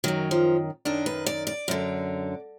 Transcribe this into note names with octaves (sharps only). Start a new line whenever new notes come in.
F#2 D#3 F#3
F3
F#2 D#3 D4
B4
D5
D5
F#2 D3